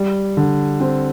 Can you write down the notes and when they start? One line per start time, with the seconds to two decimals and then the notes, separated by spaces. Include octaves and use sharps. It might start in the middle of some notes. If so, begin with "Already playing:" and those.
Already playing: G3
0.37 D3
0.80 C4